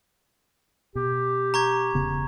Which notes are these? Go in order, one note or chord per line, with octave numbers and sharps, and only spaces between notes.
B2 G4
A#5 C#6 G#6
E1 C#3 B3